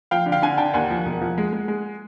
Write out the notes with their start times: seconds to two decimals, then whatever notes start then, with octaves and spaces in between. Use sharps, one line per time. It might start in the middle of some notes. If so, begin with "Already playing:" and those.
0.11 F3 F5 G5
0.26 D3
0.32 F5 G5
0.42 D3 F#5 G#5
0.58 D3 G5 A5
0.73 D#2 F#5 G#5
0.90 F3
1.05 E1
1.21 F3
1.38 G#3
1.53 G#3
1.68 G#3